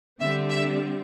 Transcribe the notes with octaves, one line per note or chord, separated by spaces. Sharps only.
D3 G3 C4 E5
E5